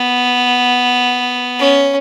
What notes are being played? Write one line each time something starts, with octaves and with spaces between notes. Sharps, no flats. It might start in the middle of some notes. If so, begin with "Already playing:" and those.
Already playing: B3
C#4